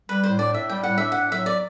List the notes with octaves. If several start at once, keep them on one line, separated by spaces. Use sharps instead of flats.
G3 B4
A2 C5
D4 D5
A2 E5
G3 G5
A2 F#5
D4 E5
A2 F#5
F#3 E5
D5